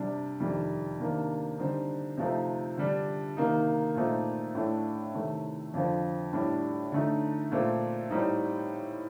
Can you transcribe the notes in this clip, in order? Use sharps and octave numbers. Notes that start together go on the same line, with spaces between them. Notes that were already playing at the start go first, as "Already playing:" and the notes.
Already playing: C3 G3 D4
F2 C3 D#3 G3
C3 D#3 A#3 D4
D3 G3 C4 D#4
C3 F3 A3 C4 D#4
D3 G3 D4
C3 D#3 A#3 D#4
A#2 A3 C4 D#4
A2 A3 D4
C3 D#3 A3
F2 D3 F3 C4
A2 G3 D4
D3 A3 D#4
A#2 A3 C4
A2 G3 C4 D#4